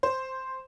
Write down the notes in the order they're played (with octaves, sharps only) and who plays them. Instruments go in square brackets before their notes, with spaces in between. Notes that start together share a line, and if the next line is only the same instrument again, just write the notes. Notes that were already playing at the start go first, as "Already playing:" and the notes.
[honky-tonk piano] C5